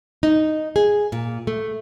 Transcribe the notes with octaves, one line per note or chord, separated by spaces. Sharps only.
D#4
G#4
A#2
A3